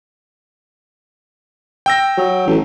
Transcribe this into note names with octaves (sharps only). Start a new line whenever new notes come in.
G5 E6 A#6
F#3
A1